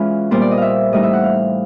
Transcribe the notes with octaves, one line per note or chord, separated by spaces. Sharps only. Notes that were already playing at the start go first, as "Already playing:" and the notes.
Already playing: E3 G#3 C#4 F4 B4
A#2 G3 B3 C5
D5
D#5
E5 F5
A2 E3 G3 C4 D#4 D#5
E5
F#5
F5